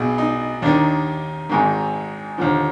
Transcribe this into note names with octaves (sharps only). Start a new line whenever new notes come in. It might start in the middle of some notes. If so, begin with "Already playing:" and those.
Already playing: B1 B2 G#4
D#4
D#2 D#3 D4
G#1 G#2 D#3
D#2 D3 F3